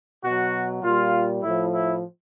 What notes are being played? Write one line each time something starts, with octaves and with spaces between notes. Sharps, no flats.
B2 F#3 F#4
A#2 G3 F4
A2 F3 E4
E4